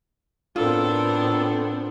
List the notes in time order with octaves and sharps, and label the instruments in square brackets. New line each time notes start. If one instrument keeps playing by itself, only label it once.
[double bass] A2 C4 [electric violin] B3 D4 [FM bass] F4 [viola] A4 A#4